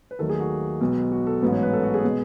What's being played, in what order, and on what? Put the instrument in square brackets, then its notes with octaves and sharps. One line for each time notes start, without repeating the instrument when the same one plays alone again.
[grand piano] B4
D#2 D#3 F#3 A3 A4
G#4
F#4
B1 B2 G#3 B3
F#4
A4
A1 G#2 F#3 B3 B4
C#5
B4
A4
F#4
G#4
B2 G#3 B3